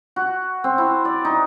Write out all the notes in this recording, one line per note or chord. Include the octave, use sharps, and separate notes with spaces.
F#4
C4
E4
D5
D#4